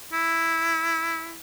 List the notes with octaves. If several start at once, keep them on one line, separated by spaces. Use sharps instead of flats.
E4